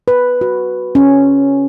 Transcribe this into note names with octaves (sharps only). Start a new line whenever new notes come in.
B4
F#4
C#4